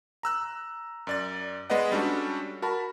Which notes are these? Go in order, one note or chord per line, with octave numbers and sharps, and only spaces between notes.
A#5 E6 F#6
F#2 D5 A6
G#3 B3 B4 D5 D#5 F#5
G3 C#4 D4 F#4 A4
F#4 A#4 A5 B5